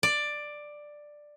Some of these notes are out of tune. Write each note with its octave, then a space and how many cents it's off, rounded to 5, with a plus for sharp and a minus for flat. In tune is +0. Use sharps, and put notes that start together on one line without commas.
D5 +10